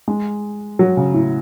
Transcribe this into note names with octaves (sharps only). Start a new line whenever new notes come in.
G#3
F#3
C#3
A2